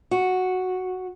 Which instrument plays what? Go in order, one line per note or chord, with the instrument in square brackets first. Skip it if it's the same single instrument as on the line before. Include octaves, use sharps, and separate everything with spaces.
[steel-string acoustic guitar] F#4